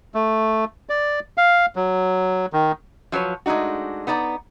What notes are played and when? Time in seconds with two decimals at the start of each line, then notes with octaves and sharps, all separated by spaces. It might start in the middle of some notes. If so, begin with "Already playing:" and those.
0.15 A3
0.89 D5
1.38 F5
1.76 F#3
2.53 D#3
3.12 F3 F#3 B4 C#5
3.46 G#3 A3 D4 D#4 F#4
4.07 B3 D#4 D5 A5 A#5